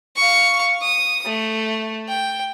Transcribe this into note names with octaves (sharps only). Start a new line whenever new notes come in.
F5 C#6
D#6
A3
G5